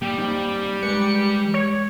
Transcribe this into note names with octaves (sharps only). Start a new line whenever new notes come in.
G3 A#3 G4 G5
A#3 C4 D#4
G#3 A#4 B4 C#7
C#5